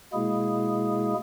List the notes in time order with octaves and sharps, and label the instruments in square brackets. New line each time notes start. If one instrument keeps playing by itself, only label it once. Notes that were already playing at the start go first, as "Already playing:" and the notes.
[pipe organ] B2 G#3 A#3 E4 G#4